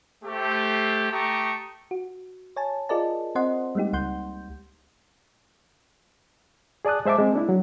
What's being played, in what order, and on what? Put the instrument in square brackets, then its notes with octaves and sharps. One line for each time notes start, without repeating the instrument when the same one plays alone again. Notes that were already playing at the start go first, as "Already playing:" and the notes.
[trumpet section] A3 G4 C5
A3 G4 A5 A#5 C#6 D#6
[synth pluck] F#4
C#5 G#5 A5
F4 G#4 A#4 D5 D#5 A5
C4 C5 D#5 F#5 C6
G3 G#3 A#3 D#4 G4
C#2 F#5 C6 G6
[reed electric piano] G#4 D5 A5 D#6 F#6
G#3 C5 E5 A5 D6
G#3 C4
A#3 D4 E4
F#3